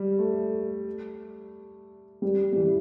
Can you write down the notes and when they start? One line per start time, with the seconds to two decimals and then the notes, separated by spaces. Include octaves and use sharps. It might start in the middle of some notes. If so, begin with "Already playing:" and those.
Already playing: G3
0.18 A3
2.22 G3
2.53 G3
2.56 E3